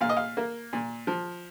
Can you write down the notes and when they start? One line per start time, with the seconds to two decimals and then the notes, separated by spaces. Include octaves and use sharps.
0.01 A#2 F5
0.09 D#5
0.17 F5
0.37 A#3
0.73 A#2
1.07 F3